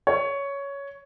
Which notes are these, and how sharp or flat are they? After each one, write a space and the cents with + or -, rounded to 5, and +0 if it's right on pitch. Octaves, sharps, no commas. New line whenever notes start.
C#5 +10